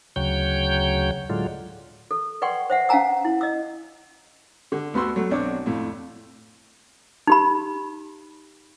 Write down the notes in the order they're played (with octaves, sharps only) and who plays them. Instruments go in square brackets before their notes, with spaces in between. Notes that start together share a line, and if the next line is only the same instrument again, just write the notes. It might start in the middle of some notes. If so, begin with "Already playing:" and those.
[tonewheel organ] D2 C#3 F#3 C#5 G5 G6
A2 D3 F#3 G#3 F4
[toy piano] A4
B4 D5 F#5 G5 C6 C#6
C5 E5 F#5
C#4 F5 F#5 G#5 A#5 E6
E4
D#5 E6
[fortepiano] D3
D2 B3 F#4 C6 E6
F#3 A3
B1 C4 D4 C#5
F2 A2
[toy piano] D#4 G4 B5